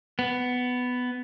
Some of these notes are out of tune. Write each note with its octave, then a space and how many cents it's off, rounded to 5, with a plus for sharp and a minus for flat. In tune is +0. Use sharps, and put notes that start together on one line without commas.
B3 +10